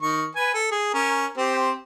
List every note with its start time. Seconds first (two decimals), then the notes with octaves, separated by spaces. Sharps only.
0.02 D#3 C#6
0.36 B4 G#5
0.54 A4
0.71 G#4
0.94 C#4 A#4
1.37 C4 G4 C5